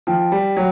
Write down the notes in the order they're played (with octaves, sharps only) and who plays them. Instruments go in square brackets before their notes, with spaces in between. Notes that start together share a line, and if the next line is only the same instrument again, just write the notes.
[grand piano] F3 [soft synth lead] G5
[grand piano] G3
F#3